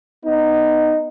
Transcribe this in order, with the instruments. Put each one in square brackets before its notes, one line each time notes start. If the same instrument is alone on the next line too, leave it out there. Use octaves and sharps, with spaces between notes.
[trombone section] B3 D#4